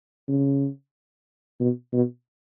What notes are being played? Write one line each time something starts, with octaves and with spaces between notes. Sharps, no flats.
C#3
B2
B2